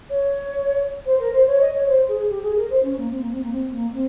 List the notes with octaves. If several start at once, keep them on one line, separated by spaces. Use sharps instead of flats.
C#5
C5
A#4
C5
C#5
D#5
C#5
C5
G#4
G4
G#4
A#4
C5
C#4
A#3
C4
A#3
C4
A#3
C4
A#3
C4